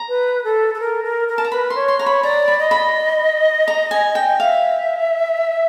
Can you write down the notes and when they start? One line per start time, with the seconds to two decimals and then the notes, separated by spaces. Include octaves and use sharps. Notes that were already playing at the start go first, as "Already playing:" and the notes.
Already playing: A#5
0.09 B4
0.44 A4
0.74 A4
0.80 A#4
1.04 A#4
1.28 A#4
1.38 A5
1.44 A#5
1.52 B4 B5
1.70 C#5 C6
1.88 C6
1.99 C#5 A#5
2.06 B5
2.23 D5 A#5
2.48 B5
2.60 D#5
2.71 B5
3.68 A#5
3.91 G#5
4.15 G5
4.39 E5 F5